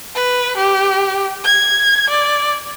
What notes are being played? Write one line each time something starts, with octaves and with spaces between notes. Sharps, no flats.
B4
G4
G#6
D5